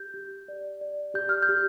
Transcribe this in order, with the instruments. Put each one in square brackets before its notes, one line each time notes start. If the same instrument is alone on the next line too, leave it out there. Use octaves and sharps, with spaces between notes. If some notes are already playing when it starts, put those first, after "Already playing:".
Already playing: [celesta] G4 G6
G4
D5
D5
G4 G6
F6
G6
G4